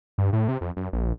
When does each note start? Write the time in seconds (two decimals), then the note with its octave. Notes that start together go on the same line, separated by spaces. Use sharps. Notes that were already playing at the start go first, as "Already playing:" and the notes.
0.18 G2
0.33 A2
0.48 C3
0.61 F2
0.77 F#2
0.93 A#1